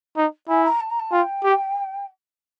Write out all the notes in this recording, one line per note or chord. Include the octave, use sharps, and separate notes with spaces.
D#4
E4 G#5
A#5
A5
A#5
A5
F4 G5
G4